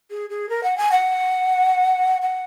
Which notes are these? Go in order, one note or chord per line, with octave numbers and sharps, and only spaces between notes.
G#4
G#4
A#4
F#5
G#5
F#5
F#5